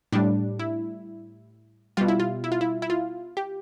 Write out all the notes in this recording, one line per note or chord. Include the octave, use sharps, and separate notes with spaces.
A2 G3 D4
E4
B2 G3 F4
E4
F4
E4
F4
E4
E4
F4
G4